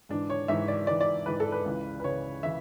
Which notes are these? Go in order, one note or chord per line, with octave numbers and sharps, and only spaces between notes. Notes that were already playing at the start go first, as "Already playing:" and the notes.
G#2 E3 D4
C#5
G#2 E3 E5
D5
G#2 E3 D5
D5
G#2 E3 B4
A4
B4
C#2 C#3 E3
B4
C#2 C#3 E3 C#5
C#3 E3 E5